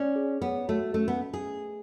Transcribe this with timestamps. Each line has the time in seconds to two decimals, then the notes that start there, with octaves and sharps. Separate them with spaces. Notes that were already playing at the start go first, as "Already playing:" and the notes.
Already playing: C#4 D5
0.16 G#4
0.42 B3 C#5
0.68 A3 F#4
0.94 A3 C#4
1.08 B3
1.20 A3
1.34 G#4